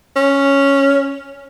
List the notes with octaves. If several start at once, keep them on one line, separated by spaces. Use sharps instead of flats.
C#4